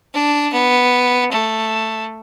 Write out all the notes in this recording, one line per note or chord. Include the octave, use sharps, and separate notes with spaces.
D4
B3
A3